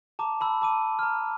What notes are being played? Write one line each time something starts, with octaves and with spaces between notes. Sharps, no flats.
A5 A#5 D6
A5 B5 E6
A5 D6 D#7
A#5 F6